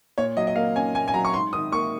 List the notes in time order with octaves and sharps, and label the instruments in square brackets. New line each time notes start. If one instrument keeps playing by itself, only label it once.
[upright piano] A#2 C#5
F#3 D#5
D#5
A#3 F5
C#4 G#5
A#2 G#5
G#5
F#3 A#5
C#6
G#2 C6
D#3 D#6
A#3 C#6